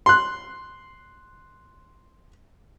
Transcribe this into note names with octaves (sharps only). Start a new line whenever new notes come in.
C6 F#6